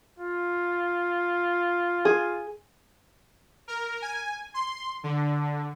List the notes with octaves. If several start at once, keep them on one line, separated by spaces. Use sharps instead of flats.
F4
G#4
A#4
G#5
C6
D3